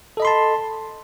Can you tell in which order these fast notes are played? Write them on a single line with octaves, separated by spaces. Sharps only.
A4 D#5 B5 C6 A5